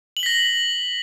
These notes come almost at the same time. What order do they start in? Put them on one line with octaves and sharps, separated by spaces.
F#7 G7 B6 A#6